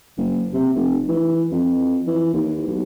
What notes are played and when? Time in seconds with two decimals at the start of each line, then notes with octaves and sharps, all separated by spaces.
0.17 F#1
0.53 C3
0.75 F1
1.09 E3
1.52 F2
2.07 E3
2.34 D#2
2.67 B1